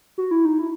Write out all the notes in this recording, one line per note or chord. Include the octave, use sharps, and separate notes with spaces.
F#4
E4
D#4
E4